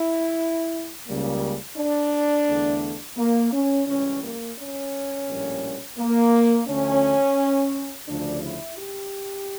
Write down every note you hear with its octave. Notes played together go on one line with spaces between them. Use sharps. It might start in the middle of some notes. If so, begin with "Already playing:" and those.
Already playing: E4
C#2 C#3 G3 A#3
D4
E2 D3 A3
A#3
C#4
C#2 C#3 E3 G3 C#4
A#3
C#4
A#1 A2 G3 A#3
A#3
D2 D3 F3 A3 C#4
D2 C#3 F3 D4
E4
G4